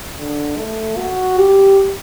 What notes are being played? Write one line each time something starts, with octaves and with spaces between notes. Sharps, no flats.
D3
A3
F#4
G4